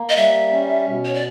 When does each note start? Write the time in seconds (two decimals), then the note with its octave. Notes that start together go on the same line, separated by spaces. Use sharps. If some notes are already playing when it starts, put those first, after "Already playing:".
Already playing: A#3
0.09 D#5
0.16 G3 E5
0.52 C#4
0.87 B2
1.05 C#5
1.14 D5